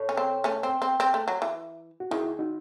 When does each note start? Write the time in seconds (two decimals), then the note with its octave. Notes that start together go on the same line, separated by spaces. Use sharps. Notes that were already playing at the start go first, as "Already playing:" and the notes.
Already playing: A4 C#5
0.09 C#4
0.17 C4
0.44 A3 C#4
0.63 C4
0.82 C4
1.00 C4
1.14 A3
1.28 F#3
1.42 E3
2.00 F#4
2.11 D#3 E4 G#4
2.39 D#4 F#4